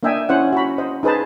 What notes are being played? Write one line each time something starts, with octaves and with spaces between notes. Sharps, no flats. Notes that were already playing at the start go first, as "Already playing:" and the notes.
A#3 D4 D#5 E5 G5 G#5
C#4 E4 C5 F#5
F#4 B5
C5 D#5
D#4 G#4 B4 C5 A5